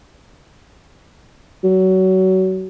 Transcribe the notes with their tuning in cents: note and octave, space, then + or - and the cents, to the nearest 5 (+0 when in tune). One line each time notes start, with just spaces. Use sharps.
F#3 +25